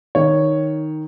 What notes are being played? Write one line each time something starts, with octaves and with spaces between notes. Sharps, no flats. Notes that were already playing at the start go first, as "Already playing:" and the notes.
D#3 C#5